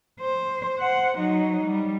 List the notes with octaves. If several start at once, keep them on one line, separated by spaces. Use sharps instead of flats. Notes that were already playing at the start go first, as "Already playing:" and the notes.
C5
C5 F#5
F#3 D#4
G3